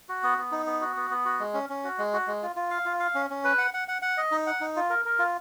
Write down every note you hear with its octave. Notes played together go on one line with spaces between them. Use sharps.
F#4
B3
B3
D#4
B3
F#4
B3
B3
F#4
G#3
C#4
C#4
F#4
G#3
F#4
G#3
F4
F4
F5
F4
F5
C#4
C#4
B4
F#5
F#5
F#5
F#5
D#5
D#4
F#5
D#4
F4
A#4
A#4
F4